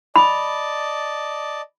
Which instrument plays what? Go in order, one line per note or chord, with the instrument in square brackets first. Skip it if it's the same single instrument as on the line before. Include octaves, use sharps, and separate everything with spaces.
[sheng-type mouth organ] D5 D#5 A5 [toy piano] B5